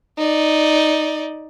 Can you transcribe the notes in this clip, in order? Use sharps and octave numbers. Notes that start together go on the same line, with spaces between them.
D#4 D5